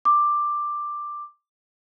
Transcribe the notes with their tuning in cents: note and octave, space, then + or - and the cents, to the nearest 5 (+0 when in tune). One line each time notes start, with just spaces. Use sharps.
D6 +10